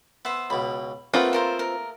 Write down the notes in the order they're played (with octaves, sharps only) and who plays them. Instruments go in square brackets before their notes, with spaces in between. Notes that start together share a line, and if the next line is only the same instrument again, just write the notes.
[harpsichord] B3 [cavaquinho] C5 E5
[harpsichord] C#2 B2 [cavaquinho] B5
[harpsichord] A3 A#3 G#4 [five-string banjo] C4 F4 B4 [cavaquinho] F#5 G5
[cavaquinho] A4 A#4 C5
A#4